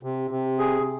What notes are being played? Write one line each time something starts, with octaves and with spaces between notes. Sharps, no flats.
C3
C3
G#4